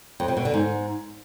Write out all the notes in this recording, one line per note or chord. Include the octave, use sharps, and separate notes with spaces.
F2
C3
B2
D3
G#2